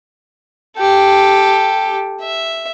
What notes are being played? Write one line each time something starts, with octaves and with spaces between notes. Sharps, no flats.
G4 A4
E5